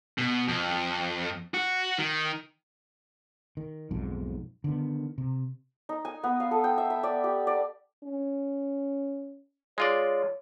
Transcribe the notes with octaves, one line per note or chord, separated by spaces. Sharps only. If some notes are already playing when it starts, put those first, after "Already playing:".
B2
F2
F#4
D#3
D#3
B1 F2 G#2
D3 D#3 B3
C3
D#4
G#5
B3
F5
A4
G5
E5
E5
D5
G4
D5
C#4
G#3 F4 C#5 D5